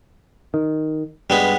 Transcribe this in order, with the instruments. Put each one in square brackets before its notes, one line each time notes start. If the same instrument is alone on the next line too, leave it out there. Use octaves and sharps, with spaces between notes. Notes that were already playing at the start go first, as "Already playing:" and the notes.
[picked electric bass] D#3
[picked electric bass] G2 [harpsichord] G3 G#3 B3